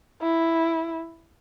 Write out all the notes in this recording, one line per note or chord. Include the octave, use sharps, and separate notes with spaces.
E4